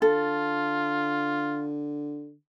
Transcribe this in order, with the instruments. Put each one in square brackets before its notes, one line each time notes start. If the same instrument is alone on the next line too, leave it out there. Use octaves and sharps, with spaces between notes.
[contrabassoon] D3 [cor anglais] F4 [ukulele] A4